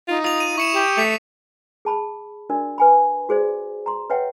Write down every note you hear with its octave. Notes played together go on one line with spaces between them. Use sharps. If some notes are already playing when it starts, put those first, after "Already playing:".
D#4 F4
F4 D#6 F7
D#7
E4 C#6 C#7 E7
G4
A3 B6 F7
G#4 A5 B5
D4 F#4 A#4 D5
B4 G#5 B5
F#4 G#4 C5 D5
A#5 C6
B4 C#5 E5 F#5 G5